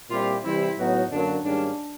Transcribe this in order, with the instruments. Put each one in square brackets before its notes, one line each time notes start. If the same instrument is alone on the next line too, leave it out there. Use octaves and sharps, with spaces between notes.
[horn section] A#2 G3 C4 E4 G4 [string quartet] F4
[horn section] C3 E3 G3 C4 [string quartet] E4
[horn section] A2 F#3 B3 D#4 F#4
[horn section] F#2 D3 F#3 A#3 [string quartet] D4
[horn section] G#2 D#3 G3 A#3 C#4 [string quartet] D4